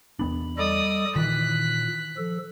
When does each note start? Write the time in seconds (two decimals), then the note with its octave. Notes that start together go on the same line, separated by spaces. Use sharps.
0.19 E2 B3 D4 B5
0.58 G3 A4 D5 D#5 D#6
1.16 A#2 D#3 E3 F#6 B6
2.17 F3 A4